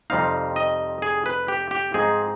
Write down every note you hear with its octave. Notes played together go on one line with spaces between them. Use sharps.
F2 C3 G3 C4 D#4 F5
D#5
G#4
B4
G4
G4
G#2 F3 C4 D#4 G#4